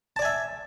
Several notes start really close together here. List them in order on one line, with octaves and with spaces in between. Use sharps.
A5 D5 G#5 E5